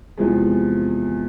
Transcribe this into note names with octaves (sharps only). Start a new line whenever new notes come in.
E2 C3 F3 G#3